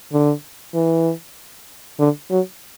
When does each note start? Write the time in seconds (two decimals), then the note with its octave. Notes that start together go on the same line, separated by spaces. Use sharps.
0.13 D3
0.74 E3
1.99 D3
2.31 F#3